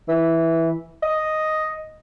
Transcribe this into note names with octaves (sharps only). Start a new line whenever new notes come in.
E3
D#5